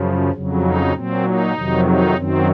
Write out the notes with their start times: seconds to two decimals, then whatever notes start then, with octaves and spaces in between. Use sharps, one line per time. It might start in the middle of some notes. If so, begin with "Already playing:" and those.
Already playing: F#2 C#3 F3
0.31 F2 C#3 F#3
0.62 D#4
0.93 A#2 F#3 C4
1.24 D#4
1.54 F2 C3 D#3 F#3
1.85 D#4
2.15 F#2 D#3 F#3 C4